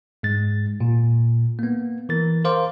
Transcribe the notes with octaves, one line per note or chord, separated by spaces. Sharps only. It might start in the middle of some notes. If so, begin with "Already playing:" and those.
G#2 G#3 A6
A#2
A#3 B3
E3 A#4 A6
A#4 C5 F5 C6 D6